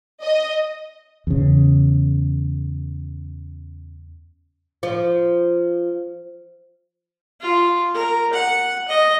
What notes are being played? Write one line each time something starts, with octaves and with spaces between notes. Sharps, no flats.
D#5
E2 C#3
F3
F4
A#4
F#5
D#5